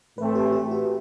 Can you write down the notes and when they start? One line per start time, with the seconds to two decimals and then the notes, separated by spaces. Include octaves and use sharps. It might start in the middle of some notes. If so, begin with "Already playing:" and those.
0.18 A2 E3 A3 C4 B4
0.35 G4
0.52 G4
0.71 F#4